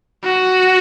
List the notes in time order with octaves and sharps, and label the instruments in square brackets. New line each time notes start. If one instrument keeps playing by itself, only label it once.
[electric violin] F#4